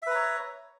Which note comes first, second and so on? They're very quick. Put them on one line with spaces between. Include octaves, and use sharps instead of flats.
E5 B4 A#5 C#5